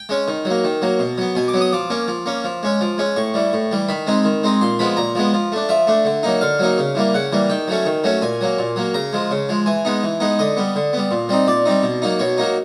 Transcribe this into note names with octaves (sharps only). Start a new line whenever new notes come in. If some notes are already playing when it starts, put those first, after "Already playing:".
Already playing: G5
G#3 C#4
D#3
F#3
A#3
D#3
F#3 A#3
B2
F#3 B3
B2 G#5
D6
F#3 B3
D#6
F3 D6
A#3 C#4
F3
A#3 C#4
F3
G#3 C#4
F3
G#3 C#4
A2 C#6
E3 G3
A2
E3 G3
D#3 B5
G#3 C4 D#4
D#3
G#3 C4 D#4
A#2 C6
F3 G#3 B3 B5
A#2 A#5
F3 G#3 B3
F3
A3 D4
F3 E5
A3 D4
D3
F#3 A#3 D#4
D3 F5
F#3 A#3 D#4
C#3
E3 G3 A#3
C#3 F#5
E3 G3 A#3
D#3 G5
F#3 A3 C#4
D#3
F#3 A3 C#4
A#2 G#5
F#3 A#3
A#2
F#3 A#3
C#3 A#5
F3 G#3
C#3
F3 G#3
E3 G#5
G#3 B3 D#4
E3
G#3 B3 D#4
D3 D#5
G3 B3
D3
G3 B3
A#2
G3 C4 D#4
A#2 D5
G3 C4 D#4
B2
F#3 A#3 D#4
B2 C#5
F#3 A#3 D#4